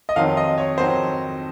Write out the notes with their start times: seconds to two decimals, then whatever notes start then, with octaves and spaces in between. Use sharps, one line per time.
0.09 D#5
0.16 F2 D#3 F#3 C4 F5
0.37 D#5
0.58 C#5
0.78 F2 D#3 F#3 C4 C5